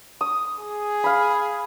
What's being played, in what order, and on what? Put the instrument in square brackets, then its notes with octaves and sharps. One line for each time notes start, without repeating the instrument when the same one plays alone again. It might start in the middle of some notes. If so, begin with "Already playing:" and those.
[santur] D#6
[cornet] G#4
[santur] F5 B5